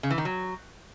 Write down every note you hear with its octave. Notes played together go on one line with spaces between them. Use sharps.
C#3
E3
D#3
F#3